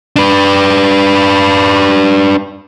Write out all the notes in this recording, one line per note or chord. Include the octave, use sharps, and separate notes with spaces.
D4 B4